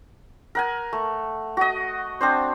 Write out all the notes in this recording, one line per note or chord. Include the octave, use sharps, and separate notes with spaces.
A#4 F#5 G#5
A3
F#4 D#5
C4 D4 C5